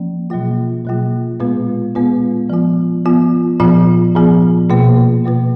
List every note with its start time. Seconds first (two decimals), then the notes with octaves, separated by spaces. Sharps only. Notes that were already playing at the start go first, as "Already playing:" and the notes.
Already playing: F3 A#3 C#4
0.30 B2 F#3 A#3 F4
0.85 B2 F#3 A#3 F4
1.40 A#2 G#3 B3 F4 B4
1.95 A#2 G#3 B3 F4 B4
2.50 F3 B3 F4
3.05 F3 B3 F4
3.60 A#2 F3 B3 F4
4.15 A#2 F3 B3 F4
4.70 B2 A#3 F4 B4
5.24 B2 A#3 F4 B4